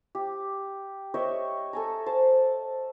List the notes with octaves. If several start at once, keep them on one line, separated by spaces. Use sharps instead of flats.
G4
C#5 D#5 E5 G5
A4 G#5 A#5
C5 A5